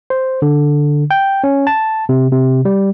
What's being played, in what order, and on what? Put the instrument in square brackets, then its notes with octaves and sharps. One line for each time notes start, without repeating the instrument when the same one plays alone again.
[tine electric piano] C5
D3
G5
C#4
A5
C3
C3
G3